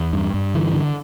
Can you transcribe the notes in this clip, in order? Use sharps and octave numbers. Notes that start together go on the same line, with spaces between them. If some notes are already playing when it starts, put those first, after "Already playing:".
Already playing: E2
G2
G2
D3 E3
D3